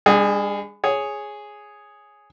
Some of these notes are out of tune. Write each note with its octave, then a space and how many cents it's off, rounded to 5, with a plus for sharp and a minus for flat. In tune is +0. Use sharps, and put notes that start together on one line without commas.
G3 +45 D4 +0 G#4 +0
G#4 +0 C#5 +0